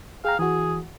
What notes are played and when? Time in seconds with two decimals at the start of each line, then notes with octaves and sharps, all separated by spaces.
0.25 G#4 F5 G5 A#5
0.39 E3 F#4 G#4